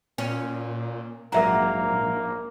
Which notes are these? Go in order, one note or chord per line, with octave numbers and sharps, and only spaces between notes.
A#2 C#4
A#1 G#2 F#3 A#3 A#4 E5 A#5